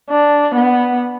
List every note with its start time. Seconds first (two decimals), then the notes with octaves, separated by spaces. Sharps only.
0.10 D4
0.55 B3